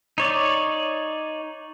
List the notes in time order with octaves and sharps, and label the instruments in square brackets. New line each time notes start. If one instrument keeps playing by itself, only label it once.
[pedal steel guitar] D#4 C#5 D5